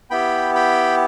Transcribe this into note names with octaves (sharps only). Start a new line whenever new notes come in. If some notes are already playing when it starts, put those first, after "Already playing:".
B3 E4 G4 G5 B5
G5 B5